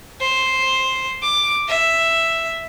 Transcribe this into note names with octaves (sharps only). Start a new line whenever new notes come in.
C5
D6
E5